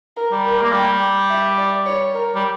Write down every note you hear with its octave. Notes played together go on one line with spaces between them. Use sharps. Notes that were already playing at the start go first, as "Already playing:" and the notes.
A#4
G3
A#4
A#3
G3 G5
E5
D5
C#5
A#4
G3